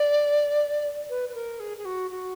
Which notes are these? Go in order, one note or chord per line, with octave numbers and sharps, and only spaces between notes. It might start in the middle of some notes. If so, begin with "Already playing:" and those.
Already playing: D5
B4
B4
A#4
G#4
G#4
F#4
F#4